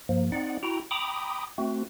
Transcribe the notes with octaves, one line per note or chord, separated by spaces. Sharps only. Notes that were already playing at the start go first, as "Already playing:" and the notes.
G2 F3 A#3
C4 D#4 D5 F#5
E4 F#4 G5 A#5
G5 A#5 B5 D6 D#6
A3 C4 F#4